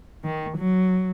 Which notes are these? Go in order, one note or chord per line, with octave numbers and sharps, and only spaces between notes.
D#3
F#3